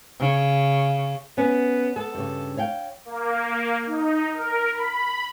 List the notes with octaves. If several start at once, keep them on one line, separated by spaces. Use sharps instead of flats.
C#3
B3 C#4
B3 A4
G2 C#3
C#5 F5 G5
A#3
D#4
A#4
B5